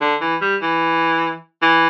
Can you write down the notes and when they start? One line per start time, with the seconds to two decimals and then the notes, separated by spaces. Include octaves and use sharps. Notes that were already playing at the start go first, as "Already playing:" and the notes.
0.01 D3
0.21 E3
0.41 G3
0.62 E3
1.62 E3